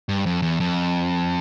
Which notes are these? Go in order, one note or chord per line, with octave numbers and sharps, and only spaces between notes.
G2
F2
E2
F2